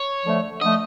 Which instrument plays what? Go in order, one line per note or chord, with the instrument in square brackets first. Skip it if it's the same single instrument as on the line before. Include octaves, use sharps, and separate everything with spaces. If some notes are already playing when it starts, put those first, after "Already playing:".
Already playing: [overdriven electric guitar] C#5
[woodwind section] D3 F3 A3
[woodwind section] D3 F3 A3 [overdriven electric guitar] D#5